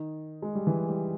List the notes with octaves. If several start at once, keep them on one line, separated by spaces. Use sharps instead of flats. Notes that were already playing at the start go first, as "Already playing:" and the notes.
Already playing: D#3
G#3
G3
E3
G3